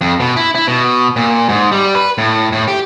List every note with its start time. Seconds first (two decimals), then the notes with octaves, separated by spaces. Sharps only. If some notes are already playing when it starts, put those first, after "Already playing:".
0.01 F2
0.20 B2
0.36 E4
0.55 E4
0.67 B2
1.16 A#2
1.49 G#2
1.72 G3
1.95 B4
2.18 A2
2.52 A2
2.68 G4